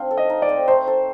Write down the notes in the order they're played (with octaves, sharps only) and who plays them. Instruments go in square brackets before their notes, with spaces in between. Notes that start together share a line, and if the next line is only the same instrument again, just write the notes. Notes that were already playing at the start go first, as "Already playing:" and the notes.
Already playing: [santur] C4 D4 [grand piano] F5
[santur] A4
[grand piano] D#5
[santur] D#4
[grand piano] D5
[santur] C4
[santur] A3 [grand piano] C5
[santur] A4